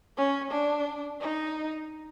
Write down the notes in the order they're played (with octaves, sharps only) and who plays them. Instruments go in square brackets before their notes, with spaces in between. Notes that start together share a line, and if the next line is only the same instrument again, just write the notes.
[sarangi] C#4
D4
D#4